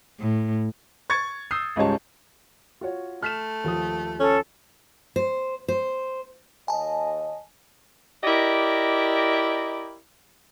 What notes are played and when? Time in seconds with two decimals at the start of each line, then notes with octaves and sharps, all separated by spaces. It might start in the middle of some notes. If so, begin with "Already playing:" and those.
0.20 A2
1.10 C#6 G#6 A6 C#7
1.51 D#6 E6 G6 C7
1.76 C#2 G#2 G3 C#5 A5
2.81 F4 F#4 C#5
3.23 A3 F6 B6 E7
3.64 D#2 F3 D#6
4.20 C#4 A4
5.16 C5
5.68 C5
6.68 D#2 D#5 G#5 A5
8.23 E4 G4 A#4 D5 D#5